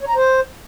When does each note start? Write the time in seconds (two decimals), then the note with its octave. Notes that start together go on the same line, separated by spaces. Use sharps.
0.01 C#5
0.08 A#5
0.16 C5